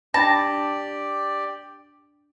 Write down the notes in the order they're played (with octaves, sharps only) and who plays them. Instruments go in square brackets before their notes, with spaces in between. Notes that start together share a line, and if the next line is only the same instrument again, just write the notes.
[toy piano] D4 G5 B5 [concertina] G4 D5 [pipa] A5 [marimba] A#6